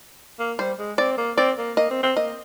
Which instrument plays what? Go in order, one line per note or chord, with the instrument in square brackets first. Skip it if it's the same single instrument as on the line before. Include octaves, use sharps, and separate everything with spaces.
[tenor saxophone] A#3
[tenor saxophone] G3 [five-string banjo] C5
[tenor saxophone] G#3
[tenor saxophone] C4 [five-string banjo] D5
[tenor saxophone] A#3
[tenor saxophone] C4 [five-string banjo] D5
[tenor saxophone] A#3
[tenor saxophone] A#3 [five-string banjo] D#5
[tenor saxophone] C4
C4
[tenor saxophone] A#3 [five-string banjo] D#5